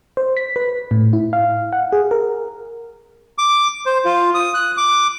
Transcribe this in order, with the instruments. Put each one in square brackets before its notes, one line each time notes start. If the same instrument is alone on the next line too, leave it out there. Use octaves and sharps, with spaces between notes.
[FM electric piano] C5
B6
B4
A2
E4
F5
F#5
G#4
A#4
[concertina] D6
C5
F4
D#6
F#6
D6